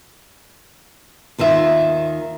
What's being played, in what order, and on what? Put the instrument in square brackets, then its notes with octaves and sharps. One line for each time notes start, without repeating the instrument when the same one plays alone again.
[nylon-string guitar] D#2 D#3 F4 E5